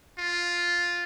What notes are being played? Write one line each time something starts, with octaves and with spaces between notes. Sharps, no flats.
F4